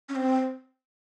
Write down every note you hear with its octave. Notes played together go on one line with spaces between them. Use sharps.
C#4
C4